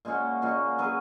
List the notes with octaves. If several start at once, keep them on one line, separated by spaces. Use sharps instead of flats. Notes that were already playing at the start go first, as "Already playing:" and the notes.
A#2 G#3 C#4 F#4
A#2 G#3 C#4 F#4
F#3 C#4 G#4 B4